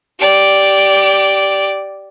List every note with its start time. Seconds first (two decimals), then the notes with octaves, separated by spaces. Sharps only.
0.19 G4 D5